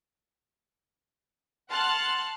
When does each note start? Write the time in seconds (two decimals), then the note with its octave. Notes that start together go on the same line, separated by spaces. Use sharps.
1.70 F#5 A5 C6 F6 F#6